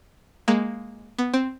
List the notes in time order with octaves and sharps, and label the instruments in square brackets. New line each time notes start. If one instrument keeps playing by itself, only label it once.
[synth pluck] G#3 A#3
B3
C4